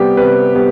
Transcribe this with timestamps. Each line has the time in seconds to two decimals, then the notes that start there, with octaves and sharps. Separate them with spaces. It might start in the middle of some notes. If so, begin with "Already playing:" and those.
Already playing: C3 G3 B3 G4
0.17 C3 B4
0.55 G3 B3